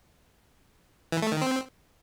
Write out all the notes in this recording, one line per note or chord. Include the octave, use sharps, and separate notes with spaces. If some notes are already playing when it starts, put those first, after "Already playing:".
E3
A3
D#3
C4